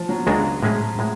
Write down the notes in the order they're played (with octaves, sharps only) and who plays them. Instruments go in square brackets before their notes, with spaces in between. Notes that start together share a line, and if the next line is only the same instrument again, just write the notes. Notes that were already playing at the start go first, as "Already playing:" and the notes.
Already playing: [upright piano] F3
F#3
[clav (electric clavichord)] C#2 C#3 G#3 D4 F#4 [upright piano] F#3
[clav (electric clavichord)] A2 G#3 C#4 G#4
A2 G#3